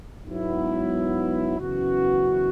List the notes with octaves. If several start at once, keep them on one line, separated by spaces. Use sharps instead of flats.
G#2 F#3 B3 E4
F#2 C#3 E3 B3 F#4